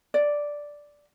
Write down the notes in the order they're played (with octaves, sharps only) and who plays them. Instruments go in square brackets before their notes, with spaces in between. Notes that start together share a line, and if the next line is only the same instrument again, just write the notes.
[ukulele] D5